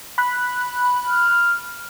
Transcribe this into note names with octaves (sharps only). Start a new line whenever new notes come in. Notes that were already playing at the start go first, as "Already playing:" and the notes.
B5 F#6
F6